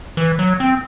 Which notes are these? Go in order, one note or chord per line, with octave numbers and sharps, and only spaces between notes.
E3
F#3
C4